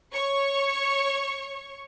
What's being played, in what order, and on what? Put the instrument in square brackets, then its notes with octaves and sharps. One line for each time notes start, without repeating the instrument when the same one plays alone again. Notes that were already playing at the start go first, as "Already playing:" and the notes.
[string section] C#5 C#6